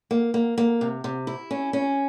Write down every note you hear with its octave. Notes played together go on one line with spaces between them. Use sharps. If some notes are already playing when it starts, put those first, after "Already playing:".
A#3
A#3
A#3
C3
C3
E4
C#4
C#4